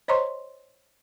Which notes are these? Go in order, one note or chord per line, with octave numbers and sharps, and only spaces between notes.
C5 C#5 D#5 A#5 C6 C#6